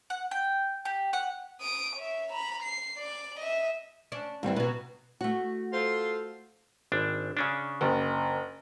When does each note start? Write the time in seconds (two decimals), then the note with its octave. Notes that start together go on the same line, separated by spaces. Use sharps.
0.10 F#5
0.31 G5
0.85 G4
1.13 F#5
1.60 D#6 D7
1.95 C#5 E5
2.32 A#5 B5
2.63 C7
2.98 D5
3.39 D#5 E5
4.12 C#4 D4
4.43 D#2 G#2 E3 G3 C4
4.56 B2 F#3 B4
5.21 A3 F#4
5.73 F4 A4 C5
6.92 G#1 D4
7.37 C#3 C#4 D4
7.81 F#1